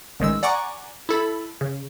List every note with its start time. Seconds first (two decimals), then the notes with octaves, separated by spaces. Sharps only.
0.20 A1 D#3 G#3 E6
0.43 D5 F#5 G#5 A#5 C#6 D6
1.09 E4 A4 B5
1.61 C#3